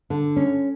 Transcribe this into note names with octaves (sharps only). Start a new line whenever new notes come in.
D3
C#4